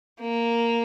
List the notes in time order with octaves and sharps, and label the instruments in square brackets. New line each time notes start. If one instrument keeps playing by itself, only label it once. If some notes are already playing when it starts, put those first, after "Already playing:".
[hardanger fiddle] A#3